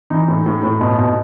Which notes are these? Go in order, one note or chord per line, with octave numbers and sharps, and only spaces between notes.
E3 D#4
A2
A2
A2
B2
B2